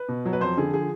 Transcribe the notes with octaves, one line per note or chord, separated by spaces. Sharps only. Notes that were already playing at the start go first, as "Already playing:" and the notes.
Already playing: B4
B2
F#3
B4
F2 C5
D3 G#4
F3 G#4